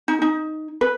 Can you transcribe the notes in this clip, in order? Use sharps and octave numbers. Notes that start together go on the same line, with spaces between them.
D#4
D#4
B4